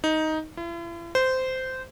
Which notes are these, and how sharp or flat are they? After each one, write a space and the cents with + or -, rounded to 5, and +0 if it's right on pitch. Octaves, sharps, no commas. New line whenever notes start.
D#4 +10
E4 +45
C5 -15